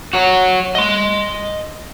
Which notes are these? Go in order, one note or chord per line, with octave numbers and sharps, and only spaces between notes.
F#4 C#5
D#5 C6